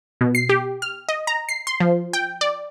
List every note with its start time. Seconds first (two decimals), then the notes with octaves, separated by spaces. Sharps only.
0.21 B2
0.35 C7
0.49 G4
0.82 F6
1.09 D#5
1.27 A#5
1.49 C7
1.67 C6
1.80 F3
2.13 G5
2.41 D5